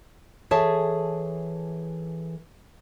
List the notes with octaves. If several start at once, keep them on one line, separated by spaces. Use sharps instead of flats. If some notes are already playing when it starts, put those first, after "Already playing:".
E3 G#4 A4 C#5 E5 A5